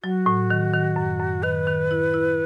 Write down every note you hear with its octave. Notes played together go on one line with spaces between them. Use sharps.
F#3 F#4
A2
D#3
D#3
F#2
F#2
D#3 B4
D#3
E4
E4